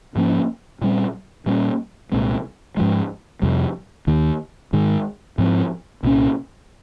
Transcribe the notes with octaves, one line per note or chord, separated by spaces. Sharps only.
G#2 F3 A#3 C#4
A#2 G3 C4
A#2 G3 A#3 C#4
C2 A#2 G#3 C4
G#2 F3 G#3
F2 C3 G3
D#2 D#3 A#3
G#2 D#3 G#3
G#2 F3 C4
C2 A#2 G#3 C#4